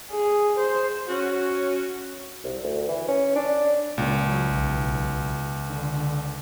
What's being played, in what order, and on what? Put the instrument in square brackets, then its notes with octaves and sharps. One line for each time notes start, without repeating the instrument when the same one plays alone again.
[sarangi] G#4
C5
[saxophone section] C#4 F#4
[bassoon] C2
D2
E3
C#4
D4
[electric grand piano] C#2 [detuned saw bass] A#2
[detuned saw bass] F#3
B1
D3